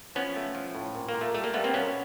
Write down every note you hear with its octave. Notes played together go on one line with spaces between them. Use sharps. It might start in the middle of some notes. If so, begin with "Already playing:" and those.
F3 B3 C#4
A3
F3
A2
A#2
A#3
A#2
A3
G3 A3
A#3
G3 A3 B3
A#3 C4
B2 B3 C#4